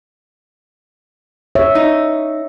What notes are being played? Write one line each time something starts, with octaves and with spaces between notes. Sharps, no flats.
C#5 E5
D#4